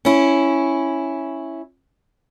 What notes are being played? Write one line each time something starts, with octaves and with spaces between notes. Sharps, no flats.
C#4 E4